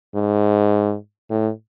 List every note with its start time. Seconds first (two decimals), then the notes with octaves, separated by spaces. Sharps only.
0.15 G#2
1.30 A2